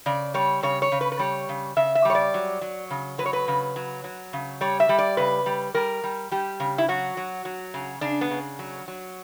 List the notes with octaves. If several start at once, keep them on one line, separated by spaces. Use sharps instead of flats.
C#3 D5
G3 C#5
C#3 C#5
C#5
C#3
B4
B4
G3 C#5
C#3
C#3 E5
E5
G3 C#5
D5
F#3
F#3
C#3
F#3 B4
C#5
B4
C#3
F#3
F#3
C#3
G3 C#5
E5
G3
D5
C#3 B4
G3
G3 A#4
G3
G3 G4
C#3
E4
F#3 F#4
F#3
F#3
C#3
C#3 D4
B3
C#3
F#3
F#3